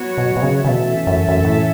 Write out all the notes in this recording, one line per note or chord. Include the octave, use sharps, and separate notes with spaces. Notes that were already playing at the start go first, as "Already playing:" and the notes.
Already playing: F#3 B3 F#4 C#5
B2
B2
C#3
C#3
B2 E3 A3 C#4 A4 E5
F#2
F#2
A2